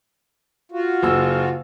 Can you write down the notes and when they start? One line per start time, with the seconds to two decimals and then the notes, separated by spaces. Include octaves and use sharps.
0.72 F4 F#4
1.03 F#1 E6